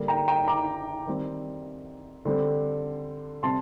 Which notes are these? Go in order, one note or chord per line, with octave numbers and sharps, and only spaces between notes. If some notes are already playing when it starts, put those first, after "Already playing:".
Already playing: D3 G3 A#3
G5 A#5
G5 A#5
A#5 D6
D#3 G3 C4
D3 G3 C4
C3 G3 C4 A5 C6